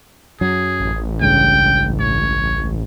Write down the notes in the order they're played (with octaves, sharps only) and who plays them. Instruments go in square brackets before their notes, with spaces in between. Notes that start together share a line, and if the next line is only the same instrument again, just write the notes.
[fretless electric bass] F#2 F#3 [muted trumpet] G#4
[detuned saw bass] A1
[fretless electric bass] C#2 G2 C#3 [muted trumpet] G5
[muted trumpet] C#5